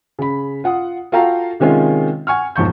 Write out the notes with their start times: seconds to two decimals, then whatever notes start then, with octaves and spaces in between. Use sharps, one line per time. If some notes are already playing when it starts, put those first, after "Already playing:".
0.19 C#3 B5
0.64 F4 F#5 D#6
1.12 F4 F#4 A4 F5 G5 A#5
1.60 C3 D#3 G#3 C#4 F4
2.27 F#5 G#5 C#6 F6
2.56 E1 G#2 F3 C#6 G6